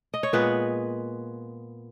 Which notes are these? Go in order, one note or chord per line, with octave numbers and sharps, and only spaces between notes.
D#5
C#5
A#2 G#3 B3 B4